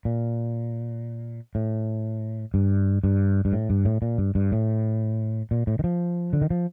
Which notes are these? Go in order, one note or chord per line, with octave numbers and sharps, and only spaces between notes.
A#2
A2
G2
G2
G2
A2
G2
A2
A#2
G2
G2
A2
A#2
A2
D#3
F3
D3
D#3
F3